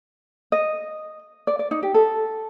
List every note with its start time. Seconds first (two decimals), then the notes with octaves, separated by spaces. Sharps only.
0.52 D#5
1.47 D5
1.59 D5
1.71 D#4
1.83 G4
1.94 A4